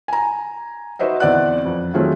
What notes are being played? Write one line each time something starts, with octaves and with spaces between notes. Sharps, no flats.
G#5 A#5
D#4 F#4 B4 C5 D#5 E5
E2 C4 D5 F#5 F#6
F2
D#3 F#3 A3 C4 F4 G#4